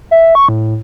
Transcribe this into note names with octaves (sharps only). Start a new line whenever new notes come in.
E5
C#6
A2